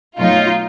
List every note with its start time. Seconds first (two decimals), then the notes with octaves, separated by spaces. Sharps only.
0.18 B2 F#3 A3 D#4 F4